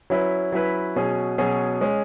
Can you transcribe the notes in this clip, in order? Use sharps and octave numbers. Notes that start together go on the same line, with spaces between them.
F#3 C#4 E4 B4
F#3 C#4 E4 B4
B2 F#3 C#4 G#4
B2 F#3 C#4 G#4
G#3 C#4 G#4